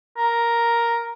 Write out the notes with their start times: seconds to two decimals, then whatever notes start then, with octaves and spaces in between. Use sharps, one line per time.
0.18 A#4